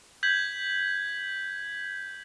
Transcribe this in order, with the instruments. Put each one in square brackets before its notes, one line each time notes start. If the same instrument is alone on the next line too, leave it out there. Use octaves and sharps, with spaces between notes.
[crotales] G6 G#6 B6 F#7